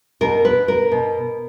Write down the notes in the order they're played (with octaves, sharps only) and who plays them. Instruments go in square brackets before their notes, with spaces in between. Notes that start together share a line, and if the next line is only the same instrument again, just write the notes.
[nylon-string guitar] B2 A#4
B4
A#4
B2